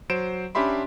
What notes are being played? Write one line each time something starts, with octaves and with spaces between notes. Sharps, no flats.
F#3 C5 D7 E7
C#4 D4 G4 E5 B5 C6